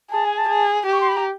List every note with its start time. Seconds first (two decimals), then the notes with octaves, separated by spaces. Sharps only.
0.11 G#4 A5
0.24 G#5
0.37 A5
0.49 G#4
0.86 G4
0.92 C#6
1.00 C6
1.08 B5
1.16 A#5